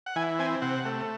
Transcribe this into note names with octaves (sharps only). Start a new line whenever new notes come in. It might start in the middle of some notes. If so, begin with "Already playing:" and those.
F#5
E3 G#5
C4 G#5
C3 F#5
A3